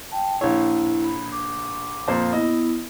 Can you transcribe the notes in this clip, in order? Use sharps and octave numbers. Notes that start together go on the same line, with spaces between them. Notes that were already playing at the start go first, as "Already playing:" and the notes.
G5 A5
A#1 E4 C#5
B5
D6
F2 A#2 C5
B3 E4 D#5